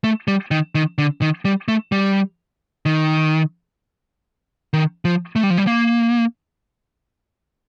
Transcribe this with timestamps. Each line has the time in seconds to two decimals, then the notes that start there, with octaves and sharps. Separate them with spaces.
0.04 A3
0.28 G3
0.51 D#3
0.75 D#3
0.98 D3
1.22 D#3
1.45 G3
1.68 A3
1.92 G3
2.86 D#3
4.73 D#3
5.05 F3
5.36 A3
5.43 G3
5.50 F3
5.58 G3
5.67 A#3